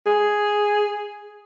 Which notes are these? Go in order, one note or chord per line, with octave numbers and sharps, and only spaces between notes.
G#4